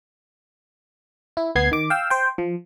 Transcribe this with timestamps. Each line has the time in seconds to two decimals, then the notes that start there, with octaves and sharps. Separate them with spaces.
1.37 E4
1.55 D2 B3 G#6 C7
1.72 D#3 D6
1.90 F5 G5 E6
2.10 C5 G5
2.38 F3